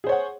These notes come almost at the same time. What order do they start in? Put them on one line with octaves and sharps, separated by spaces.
G#4 C5 C#5 F#5